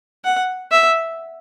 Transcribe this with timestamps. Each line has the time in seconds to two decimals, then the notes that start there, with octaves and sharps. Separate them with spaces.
0.24 F#5
0.71 E5